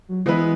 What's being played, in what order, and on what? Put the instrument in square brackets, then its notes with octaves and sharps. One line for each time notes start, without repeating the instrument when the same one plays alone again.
[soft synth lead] F#3
[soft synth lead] E3 [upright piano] G#3 B3 E4 B4